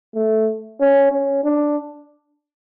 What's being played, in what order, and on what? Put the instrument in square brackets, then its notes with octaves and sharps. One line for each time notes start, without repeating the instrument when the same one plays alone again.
[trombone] A3
C#4
C#4
D4